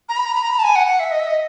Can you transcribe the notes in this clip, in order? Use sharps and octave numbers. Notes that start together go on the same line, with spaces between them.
A#5
B5
A#5
B5
A#5
B5
A5
G#5
F#5
F#5
E5
D#5
E5
D#5